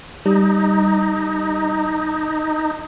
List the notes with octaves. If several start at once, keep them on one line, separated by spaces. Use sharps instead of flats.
G3 D#4